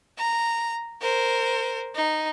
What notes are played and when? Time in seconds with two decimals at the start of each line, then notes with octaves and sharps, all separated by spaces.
0.18 A#5
1.01 A#4 C5
1.95 D#4